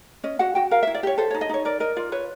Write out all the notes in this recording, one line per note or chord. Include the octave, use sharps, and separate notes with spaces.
C#4 D#5
F#4 F#5
F#4 G5
A#4 F5
E5
E4
D5
G4 C#5
A4 C5
C#5
D#4
D#5
D#4 C#5
A#4 D5
A#4 D#5
F4 D5
B4 C#5